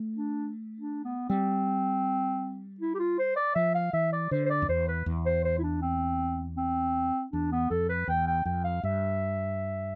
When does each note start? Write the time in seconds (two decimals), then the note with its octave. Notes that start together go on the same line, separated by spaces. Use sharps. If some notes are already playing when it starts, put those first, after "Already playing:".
Already playing: A3
0.16 D4
0.79 D4
1.04 B3
1.29 G3 C4
2.80 E4
2.94 G4
2.99 F4
3.18 C5
3.36 D5
3.55 F3 E5
3.75 F5
3.93 E3 E5
4.13 D5
4.31 D3 C5
4.46 C5
4.50 D5
4.62 F2
4.68 E2 C5
4.88 B4
5.06 E2
5.26 C5
5.44 C5
5.58 E4
5.63 D4
5.81 C4
6.57 C4
7.32 E2 D4
7.52 B3
7.70 F2 A4
7.89 B4
8.08 E2 G5
8.27 G5
8.45 F2 G5
8.64 F5
8.83 G2 E5